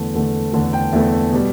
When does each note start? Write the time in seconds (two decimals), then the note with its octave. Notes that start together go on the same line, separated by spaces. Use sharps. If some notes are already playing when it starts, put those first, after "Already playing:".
Already playing: E2 D3 A3
0.14 E2 D3 A3
0.53 E2 D3 A3
0.73 G5
0.92 E2 D3 A3 E5
1.33 B2 G3